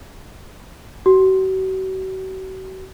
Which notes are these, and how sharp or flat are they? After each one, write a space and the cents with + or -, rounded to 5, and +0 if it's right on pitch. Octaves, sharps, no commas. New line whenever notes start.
F#4 +40